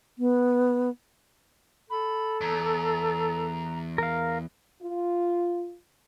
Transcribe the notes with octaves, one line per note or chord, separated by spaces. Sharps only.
B3
A4 B5
E2 A#5
A#4 F5
F4